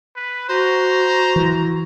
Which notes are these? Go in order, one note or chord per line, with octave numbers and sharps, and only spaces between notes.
B4
F#4 C5 A#5
E3